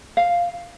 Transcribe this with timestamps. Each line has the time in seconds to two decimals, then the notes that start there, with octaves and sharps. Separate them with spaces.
0.17 F5